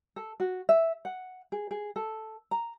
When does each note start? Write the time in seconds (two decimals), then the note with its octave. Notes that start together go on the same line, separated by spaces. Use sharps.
0.16 A4
0.40 F#4
0.69 E5
1.05 F#5
1.52 G#4
1.71 G#4
1.96 A4
2.51 A#5